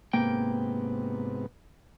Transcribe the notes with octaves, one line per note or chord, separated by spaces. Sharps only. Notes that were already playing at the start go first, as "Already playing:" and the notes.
G#2 C3 A#3 B3 G5